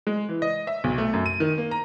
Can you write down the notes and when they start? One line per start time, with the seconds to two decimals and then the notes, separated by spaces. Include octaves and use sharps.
0.07 G#3
0.29 E3
0.42 D#5
0.67 E5
0.84 B1
0.98 A3
1.13 F#2
1.26 D#7
1.40 D#3
1.58 A#3
1.71 A#5